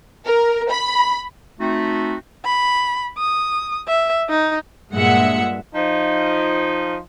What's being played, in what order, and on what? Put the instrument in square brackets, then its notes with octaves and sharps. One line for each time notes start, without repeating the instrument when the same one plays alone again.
[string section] A#4
B5
[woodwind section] A3 C4 D#4 F#4
[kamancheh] B5
D#6
E5
D#4
[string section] G2 A#2 G#3 E5 F#5 C#7
[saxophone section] F3 D#4